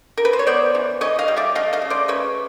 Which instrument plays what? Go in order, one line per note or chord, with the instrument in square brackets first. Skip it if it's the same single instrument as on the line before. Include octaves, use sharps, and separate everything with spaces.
[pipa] A#4
B4
C5
C#5
B3 C5 D5
E3
E3 C#5 D#5
D#5 F5
G3
D5 E5
A3 D#5 F5
D#5 F5
C#3
C5 D5
C#3 B4 C#5